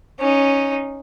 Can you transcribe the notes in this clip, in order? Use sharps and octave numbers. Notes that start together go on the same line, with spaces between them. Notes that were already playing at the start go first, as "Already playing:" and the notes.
C#4 D#4